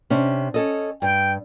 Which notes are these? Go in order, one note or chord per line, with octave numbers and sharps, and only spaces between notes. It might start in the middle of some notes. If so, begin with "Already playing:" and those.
C3 C#4 D4
C#4 A4 D#5
G2 G5